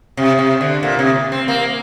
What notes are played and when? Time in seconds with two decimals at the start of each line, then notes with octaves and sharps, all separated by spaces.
0.17 C3
0.39 C3
0.61 D3
0.83 A#2
0.99 C3
1.32 C4
1.48 A#3